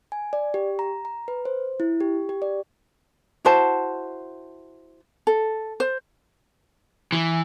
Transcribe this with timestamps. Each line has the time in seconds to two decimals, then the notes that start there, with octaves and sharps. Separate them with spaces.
0.12 G#5
0.33 D5
0.54 G4
0.79 A#5
1.05 A#5
1.28 B4
1.45 C5
1.80 E4
2.00 G4
2.29 G4
2.42 D5
3.45 E4 F#4 C5 A5
5.27 A4
5.80 C5
7.12 E3